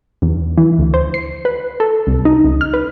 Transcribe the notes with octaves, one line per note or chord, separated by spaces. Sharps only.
E2
E3
D2
C5
C7
B4
A4
C2
D#4
C#2
F6
B4